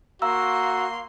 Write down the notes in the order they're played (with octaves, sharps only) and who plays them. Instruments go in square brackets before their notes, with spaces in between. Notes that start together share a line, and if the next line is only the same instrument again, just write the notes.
[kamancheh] A#3 C6 [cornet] F#4 [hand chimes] F5 A#5 E6